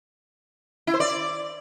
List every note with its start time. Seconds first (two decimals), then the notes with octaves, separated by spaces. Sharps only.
0.87 E4
0.94 C5
1.00 D5